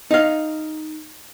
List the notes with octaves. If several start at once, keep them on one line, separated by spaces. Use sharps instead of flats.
D#4 F5